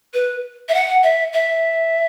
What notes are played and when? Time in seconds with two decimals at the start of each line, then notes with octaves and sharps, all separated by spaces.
0.14 B4
0.69 E5
0.74 F#5
1.03 E5
1.33 E5